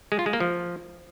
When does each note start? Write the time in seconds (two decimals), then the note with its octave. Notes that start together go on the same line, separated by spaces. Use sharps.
0.12 G#3
0.19 F4
0.26 G#3
0.33 A#3
0.40 F3